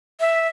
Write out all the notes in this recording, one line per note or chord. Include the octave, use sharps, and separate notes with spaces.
E5